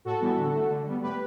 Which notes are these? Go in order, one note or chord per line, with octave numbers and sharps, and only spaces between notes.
A2 F#4 A4
E3 G3 B3
D3
A3
D3
G3 B3
A2 G4 B4